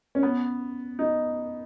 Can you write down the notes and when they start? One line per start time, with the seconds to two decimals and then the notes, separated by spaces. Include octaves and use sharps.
0.15 C#4
0.23 B3
0.99 D#4